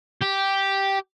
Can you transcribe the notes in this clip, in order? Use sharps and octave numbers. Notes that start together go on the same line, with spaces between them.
G4